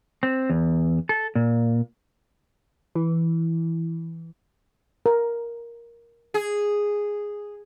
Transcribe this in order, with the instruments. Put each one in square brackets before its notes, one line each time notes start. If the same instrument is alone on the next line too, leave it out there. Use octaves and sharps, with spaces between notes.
[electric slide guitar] C4
E2
A4
A#2
[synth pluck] E3
[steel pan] A#4
[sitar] G#4